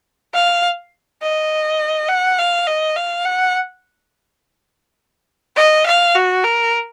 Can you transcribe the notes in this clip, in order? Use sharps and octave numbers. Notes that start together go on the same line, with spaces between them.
F5
D#5
F#5
F5
D#5
F5
F#5
D#5
F5
F#4
A#4